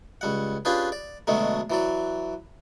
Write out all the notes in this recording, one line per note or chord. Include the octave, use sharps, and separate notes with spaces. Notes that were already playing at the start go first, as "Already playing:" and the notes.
C#2 G3 F#5
C#4 D4 F4 G4 G#4 B4
D5
B2 D3 F#3 G#3 A3
E3 F#3 D5